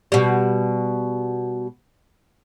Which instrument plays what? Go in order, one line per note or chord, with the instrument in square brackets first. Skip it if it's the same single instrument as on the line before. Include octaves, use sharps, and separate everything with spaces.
[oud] B2 G3